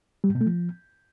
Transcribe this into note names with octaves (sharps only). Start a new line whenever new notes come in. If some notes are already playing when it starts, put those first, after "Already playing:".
G3
G#2
B2
A3
F3